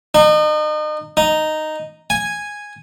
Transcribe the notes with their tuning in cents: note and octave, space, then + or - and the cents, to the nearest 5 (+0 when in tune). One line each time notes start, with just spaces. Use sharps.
D#4 -35
D#4 -5
G#5 -5